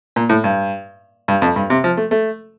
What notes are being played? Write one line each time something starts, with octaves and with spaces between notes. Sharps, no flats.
A#2
A2
G2
G2
F2
G2
C3
F3
A3
A3